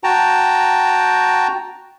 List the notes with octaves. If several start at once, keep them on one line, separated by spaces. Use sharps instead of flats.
F#4 G5 A5 A#5